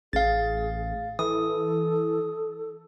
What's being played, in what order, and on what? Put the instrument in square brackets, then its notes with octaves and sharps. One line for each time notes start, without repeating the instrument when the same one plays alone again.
[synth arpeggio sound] A1 [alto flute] G#4 [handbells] F5 A6
[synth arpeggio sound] E3 [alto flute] A4 [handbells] D#6